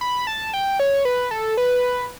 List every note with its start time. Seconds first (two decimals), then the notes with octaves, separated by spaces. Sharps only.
0.01 B5
0.27 A5
0.53 G5
0.80 C#5
1.05 B4
1.31 A4
1.57 B4